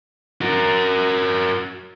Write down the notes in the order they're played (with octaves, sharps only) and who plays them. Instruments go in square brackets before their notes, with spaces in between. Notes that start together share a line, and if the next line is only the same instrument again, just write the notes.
[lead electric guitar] F#4 A#4